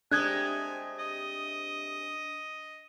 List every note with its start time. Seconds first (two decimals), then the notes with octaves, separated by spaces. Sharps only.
0.11 C3 G#3 A3 D4 G#5 D#6 F#6 G#6
0.99 D#5